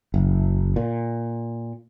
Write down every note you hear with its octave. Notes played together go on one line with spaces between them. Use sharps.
F#1
A#2